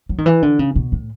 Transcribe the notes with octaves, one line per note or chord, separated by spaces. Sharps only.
F#3
D#3
E3
D3
C#3
B2
A2